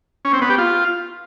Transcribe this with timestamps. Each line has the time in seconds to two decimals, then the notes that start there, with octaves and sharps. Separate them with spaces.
0.25 C#4
0.33 C4
0.41 B3
0.50 G4
0.58 F4